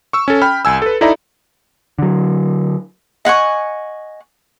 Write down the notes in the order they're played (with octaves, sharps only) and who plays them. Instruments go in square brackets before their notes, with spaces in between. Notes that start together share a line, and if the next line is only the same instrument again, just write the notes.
[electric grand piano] C#6 E6
C#4 A4
G5 B5 F6
C2 G#5 E6
A4 B4
D#4 E4 A4 D5 E5 A#5
[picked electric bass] D3 F#3
[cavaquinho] D#5 F#5 G#5 C#6